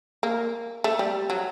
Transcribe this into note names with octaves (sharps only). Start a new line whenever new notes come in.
A#3
A3
G3
F#3